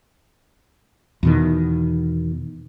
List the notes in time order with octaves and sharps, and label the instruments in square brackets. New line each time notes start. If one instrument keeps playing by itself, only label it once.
[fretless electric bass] E2 B2 D#3